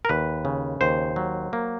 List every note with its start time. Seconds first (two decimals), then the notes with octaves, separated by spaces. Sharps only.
0.05 A#4
0.09 D#2 B4
0.45 C#3
0.81 D#2 C5
1.16 F#3
1.53 A#3